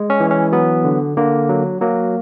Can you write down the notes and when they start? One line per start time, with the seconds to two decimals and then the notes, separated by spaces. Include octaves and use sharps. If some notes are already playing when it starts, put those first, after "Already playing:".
Already playing: G#3
0.10 C#4
0.20 E3
0.31 C#4
0.52 F#3 B3
0.84 D3
1.17 D3 A#3
1.49 F#3
1.81 F#3 A#3